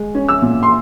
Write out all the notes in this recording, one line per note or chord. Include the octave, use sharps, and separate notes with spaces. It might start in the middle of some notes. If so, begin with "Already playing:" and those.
Already playing: G#3
C#4
E6
A#2
C6